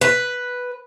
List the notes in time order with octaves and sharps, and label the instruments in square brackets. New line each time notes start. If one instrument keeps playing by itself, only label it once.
[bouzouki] B4